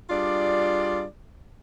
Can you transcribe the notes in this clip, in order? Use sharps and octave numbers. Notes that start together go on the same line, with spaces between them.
G3 D4 F4 G#4 D5